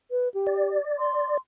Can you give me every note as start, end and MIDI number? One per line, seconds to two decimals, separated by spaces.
0.11 0.29 71
0.34 0.78 67
0.47 1.37 74
0.99 1.38 84